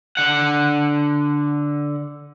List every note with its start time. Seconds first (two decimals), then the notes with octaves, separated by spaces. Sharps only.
0.17 D3 F#5